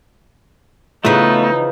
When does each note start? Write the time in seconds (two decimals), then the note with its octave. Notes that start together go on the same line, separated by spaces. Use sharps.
1.05 C#3 E3 F3 A3 B3 D#4 B4